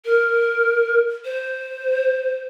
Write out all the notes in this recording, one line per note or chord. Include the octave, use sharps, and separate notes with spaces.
A#4
C5